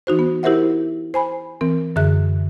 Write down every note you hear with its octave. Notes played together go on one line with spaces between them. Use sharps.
E3 D#4 F#4 C5
B3
E4 G4 A#4 C5 E5 F#5
C5 G#5 B5
E3 C4 A#4
F#2 D3 G#4 E5 F#6